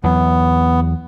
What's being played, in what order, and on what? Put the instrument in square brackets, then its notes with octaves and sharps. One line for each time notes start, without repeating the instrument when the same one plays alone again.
[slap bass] E2 F#3 [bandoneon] B3